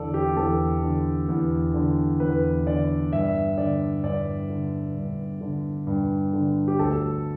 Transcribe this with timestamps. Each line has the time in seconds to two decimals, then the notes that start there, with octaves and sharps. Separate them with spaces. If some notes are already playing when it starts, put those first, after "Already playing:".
Already playing: E2 D3 A4 D5
0.14 G4
0.37 E2 A4
0.82 D3
1.29 E2
1.74 D3
2.20 E2 B4
2.66 D3 D5
3.13 G2 E5
3.57 D3 D5
4.04 G2 D5
4.50 D3
4.95 G2
5.41 D3
5.87 G2
6.33 D3
6.68 G4
6.79 D2 A4